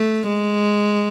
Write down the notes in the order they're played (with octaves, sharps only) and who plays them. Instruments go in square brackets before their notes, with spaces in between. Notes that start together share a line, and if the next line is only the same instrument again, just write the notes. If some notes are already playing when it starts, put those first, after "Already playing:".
Already playing: [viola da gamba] A3
G#3